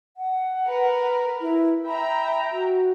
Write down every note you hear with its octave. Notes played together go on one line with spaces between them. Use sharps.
F#5
A#4 B4
E4
E5 G5 A#5 B5
F#4